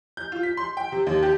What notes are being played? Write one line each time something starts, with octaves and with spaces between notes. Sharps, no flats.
G6
F4
B6
C6
G5
C3
D#2
G4